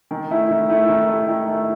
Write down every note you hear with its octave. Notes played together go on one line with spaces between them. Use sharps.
D#3
A3 E4
D#3
A3 E4
D#3
A3 E4
D#3
A3 E4